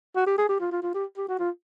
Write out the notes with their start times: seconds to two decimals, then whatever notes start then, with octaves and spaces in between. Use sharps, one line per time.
0.16 F#4
0.27 G4
0.38 G#4
0.49 G4
0.60 F4
0.72 F4
0.82 F4
0.94 G4
1.17 G4
1.28 F#4
1.39 F4